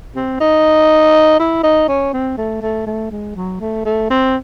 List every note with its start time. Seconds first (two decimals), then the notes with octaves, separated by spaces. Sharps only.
0.16 C4
0.40 D#4
1.39 E4
1.64 D#4
1.88 C#4
2.13 C4
2.38 A3
2.62 A3
2.87 A3
3.11 G#3
3.36 F#3
3.61 A3
3.85 A3
4.10 C4